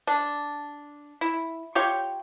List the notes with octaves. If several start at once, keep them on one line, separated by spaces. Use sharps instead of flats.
D4
E4
F4 G4 C#5 G5